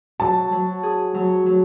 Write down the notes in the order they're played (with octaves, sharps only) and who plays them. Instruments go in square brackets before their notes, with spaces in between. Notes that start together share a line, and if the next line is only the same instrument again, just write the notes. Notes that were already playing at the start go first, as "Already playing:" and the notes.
[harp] F#3 [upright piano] A5
[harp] F#3
G#4
F#3
F#3